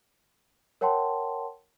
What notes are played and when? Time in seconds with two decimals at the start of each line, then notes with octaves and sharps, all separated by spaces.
0.81 A#4 C#5 F#5 G5 A5 C6